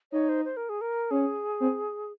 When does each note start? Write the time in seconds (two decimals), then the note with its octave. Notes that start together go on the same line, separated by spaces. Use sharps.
0.12 D#4 C#5
0.29 C5
0.45 C5
0.57 A#4
0.69 G#4
0.81 A#4
1.11 C#4 G#4
1.60 C4